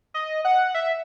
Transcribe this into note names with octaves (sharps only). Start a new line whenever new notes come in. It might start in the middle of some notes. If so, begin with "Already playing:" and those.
D#5
F#5
E5